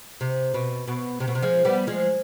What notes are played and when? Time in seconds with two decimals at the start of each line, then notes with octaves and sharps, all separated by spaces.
0.21 C3
0.54 B2
0.87 B2
1.20 C3
1.28 B2
1.35 C3
1.42 F3 G#3
1.65 G3 B3
1.87 F3 G#3